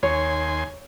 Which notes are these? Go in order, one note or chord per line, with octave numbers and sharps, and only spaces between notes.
D#2 C#5 G#5 C6